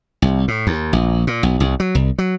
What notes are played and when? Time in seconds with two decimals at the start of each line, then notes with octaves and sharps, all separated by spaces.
0.22 C2
0.48 A2
0.67 D#2
0.93 A#1
1.27 A#2
1.43 B1
1.60 C2
1.80 F#3
1.95 C2
2.18 F#3